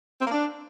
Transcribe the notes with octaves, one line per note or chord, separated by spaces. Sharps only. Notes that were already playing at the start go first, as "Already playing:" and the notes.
C4
A#3
D4